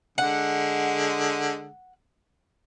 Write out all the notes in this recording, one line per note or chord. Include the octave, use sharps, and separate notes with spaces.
D3 G#3 F#5